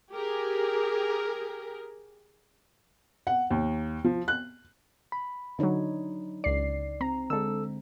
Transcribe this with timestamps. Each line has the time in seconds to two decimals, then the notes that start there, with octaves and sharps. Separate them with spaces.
0.12 G4 G#4 A#4
3.27 F#5
3.51 D#2
4.04 F3
4.28 F#6
5.12 B5
5.59 D3 F#3 D4 D#4 C#5
6.44 C#2 D5 C7
7.01 C4 A#5
7.30 D3 G#3 A4 E6